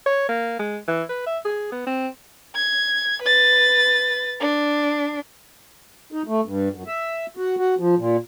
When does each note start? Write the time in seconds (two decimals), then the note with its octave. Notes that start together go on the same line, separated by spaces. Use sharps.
0.06 C#5
0.29 A#3
0.59 G#3
0.88 E3
1.09 B4
1.26 E5
1.45 G#4
1.72 B3
1.86 C4
2.55 G#6
3.22 B4 A6
4.40 D4
6.12 D#4
6.28 A3
6.45 G2
6.75 F#2
6.87 E5
7.37 F#4
7.57 F#4
7.79 F3
7.98 A#2